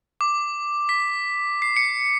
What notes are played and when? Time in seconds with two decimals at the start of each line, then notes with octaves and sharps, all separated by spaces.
0.21 D6
0.89 B6
1.62 C7
1.76 C#7